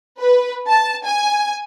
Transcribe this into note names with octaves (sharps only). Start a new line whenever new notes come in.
B4
A5
G#5